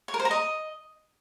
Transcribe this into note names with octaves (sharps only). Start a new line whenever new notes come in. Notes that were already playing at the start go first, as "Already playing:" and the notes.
C#5
A#4
C5
A#5
D#5